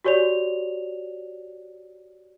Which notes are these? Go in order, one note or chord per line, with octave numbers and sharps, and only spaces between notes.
F#4 G4 C#5 D5 F7